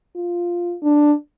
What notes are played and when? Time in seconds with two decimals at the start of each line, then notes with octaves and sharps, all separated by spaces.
0.16 F4
0.83 D4